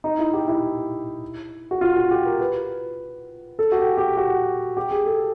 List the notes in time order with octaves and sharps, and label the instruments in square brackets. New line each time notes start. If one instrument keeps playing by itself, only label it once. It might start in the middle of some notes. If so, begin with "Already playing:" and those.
[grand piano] D#4
E4
G4
E4
F#4
F4
F#4
G4
A#4
B4
A4
F#4
G4
G4
F#4
G4
G#4
A4